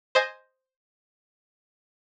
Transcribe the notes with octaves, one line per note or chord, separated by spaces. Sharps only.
C5 D#5 G#5